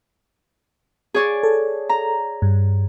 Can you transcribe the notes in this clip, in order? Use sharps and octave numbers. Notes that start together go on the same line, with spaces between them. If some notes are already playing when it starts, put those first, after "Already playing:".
G#4 C#5 D5
A4
A#5
G2